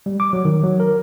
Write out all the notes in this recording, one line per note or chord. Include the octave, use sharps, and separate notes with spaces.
G3
D6
F#3
D#3
F#3
A#4